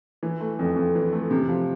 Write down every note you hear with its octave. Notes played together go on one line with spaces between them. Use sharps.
E3
A3
F2
F2
E3
A3
C3
F3